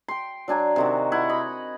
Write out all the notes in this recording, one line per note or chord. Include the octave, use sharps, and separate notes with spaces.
G5 C6
F#3 D4 G#5 A#5
C3 D#3 F#4
E4 F#5
D#5 B5